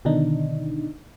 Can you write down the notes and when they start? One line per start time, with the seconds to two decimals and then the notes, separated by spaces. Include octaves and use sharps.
0.05 B2 D3 D#3 D4 D#4